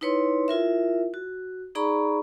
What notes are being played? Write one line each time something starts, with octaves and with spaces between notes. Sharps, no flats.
D#4 E4 B4 C#5 C6
E4 F4 A#4 E5
F#4
D#4 G#4 D5 A#5 B5 C#6